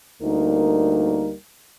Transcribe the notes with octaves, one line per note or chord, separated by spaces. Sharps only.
D2 G3 A#3 D#4 A#4